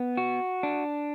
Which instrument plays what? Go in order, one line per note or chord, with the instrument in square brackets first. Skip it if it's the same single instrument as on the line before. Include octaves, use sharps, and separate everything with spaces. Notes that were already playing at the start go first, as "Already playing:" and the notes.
Already playing: [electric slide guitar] B3
F#4
D4